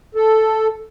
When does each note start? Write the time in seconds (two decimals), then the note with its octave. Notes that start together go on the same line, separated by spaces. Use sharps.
0.15 A4